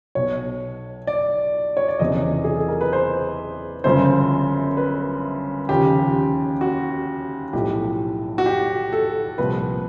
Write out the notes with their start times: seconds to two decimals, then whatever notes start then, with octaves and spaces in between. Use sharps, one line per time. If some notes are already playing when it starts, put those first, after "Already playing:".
0.15 B1 B2 C#5
1.07 D5
1.77 C#5
1.89 D5
1.99 F#1 E2 C3 D#5
2.44 G#4
2.56 A4
2.68 A#4
2.81 B4
2.93 C5
3.84 G1 F#2 C#3 F3 C5
4.77 B4
5.69 D#2 C#3 F3 G4
6.61 F#4
7.53 B1 A2 F3 G4
8.38 F#4
8.46 G4
8.92 A4
9.38 C2 A#2 F3 B4